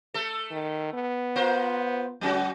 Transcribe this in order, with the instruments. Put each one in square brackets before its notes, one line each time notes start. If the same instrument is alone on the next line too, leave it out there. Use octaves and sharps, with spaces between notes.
[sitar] A3 A4
[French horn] D#3
B3
[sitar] F4 A#4 C5
[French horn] D2 [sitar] F#3 C#4 F#4